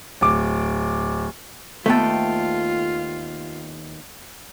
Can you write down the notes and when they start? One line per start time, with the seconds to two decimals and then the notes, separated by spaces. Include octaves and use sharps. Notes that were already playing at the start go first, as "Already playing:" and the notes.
0.21 D1 D6
1.86 D#2 A3 B3 F4 A4 G5